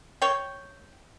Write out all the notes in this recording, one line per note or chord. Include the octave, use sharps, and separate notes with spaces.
C#5 G5